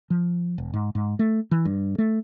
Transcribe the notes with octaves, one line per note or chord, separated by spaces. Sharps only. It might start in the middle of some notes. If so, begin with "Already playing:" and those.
F3
E1
G#2
G#2
A3
E3
G2
A3